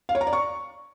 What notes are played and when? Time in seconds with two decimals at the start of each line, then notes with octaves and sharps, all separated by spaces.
0.09 F5
0.15 C#5
0.21 A#5
0.27 D5
0.33 C#6